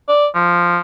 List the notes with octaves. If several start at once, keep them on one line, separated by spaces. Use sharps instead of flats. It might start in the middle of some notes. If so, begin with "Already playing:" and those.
D5
F3